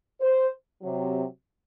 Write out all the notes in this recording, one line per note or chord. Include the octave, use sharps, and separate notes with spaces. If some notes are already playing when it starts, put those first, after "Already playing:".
C5
C3 F#3